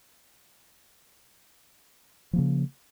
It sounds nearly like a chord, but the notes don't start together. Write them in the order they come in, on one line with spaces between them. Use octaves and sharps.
F3 A#3 C#3